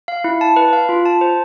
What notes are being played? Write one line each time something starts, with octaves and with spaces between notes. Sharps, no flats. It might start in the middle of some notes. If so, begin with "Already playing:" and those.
F5
E4
A5
B4
F5
F4
A5
C5